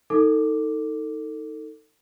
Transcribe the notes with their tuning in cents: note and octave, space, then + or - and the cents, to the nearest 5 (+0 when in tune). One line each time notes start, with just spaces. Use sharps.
D#4 +20 A4 +25 D6 +5